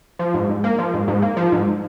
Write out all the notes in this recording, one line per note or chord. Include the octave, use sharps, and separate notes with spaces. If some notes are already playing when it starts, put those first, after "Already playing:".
F3
G#2
G#2
A#3
F3
G#2
G#2
A#3
F3
G#2